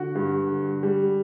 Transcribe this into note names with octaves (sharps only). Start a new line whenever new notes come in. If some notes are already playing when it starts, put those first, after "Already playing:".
Already playing: D3 F#4
G2
D3
G3